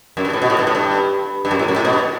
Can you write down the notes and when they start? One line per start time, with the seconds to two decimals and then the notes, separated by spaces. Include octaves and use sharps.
0.17 F#2
0.25 G2
0.33 A2
0.42 B2
0.50 A2
0.59 G2
0.67 A2
0.75 G2
1.45 G2
1.51 F#2
1.59 A2
1.68 F#2
1.76 A2
1.85 B2
1.93 G2